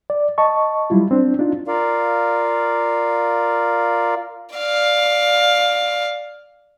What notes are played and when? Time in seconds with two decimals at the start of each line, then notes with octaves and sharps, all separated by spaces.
0.10 D5
0.38 D#5 A5 C#6
0.90 F#3 G3 E4 F4
1.11 C4 D4
1.39 D4 D#4 F4
1.68 F4 A#4 D5 F5
4.56 D5 F5